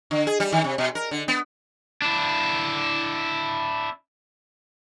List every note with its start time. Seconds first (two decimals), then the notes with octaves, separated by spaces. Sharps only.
0.11 D3
0.27 G#4
0.40 G3
0.52 D#3
0.64 C3
0.78 B2
0.95 A#4
1.11 D3
1.28 B3
2.02 D4 E4